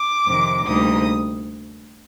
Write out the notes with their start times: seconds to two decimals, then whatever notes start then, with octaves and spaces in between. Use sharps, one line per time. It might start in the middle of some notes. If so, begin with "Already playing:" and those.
Already playing: D6
0.25 F2 C3 D#3
0.65 D2 C3 G3 A#3 D#4 D#6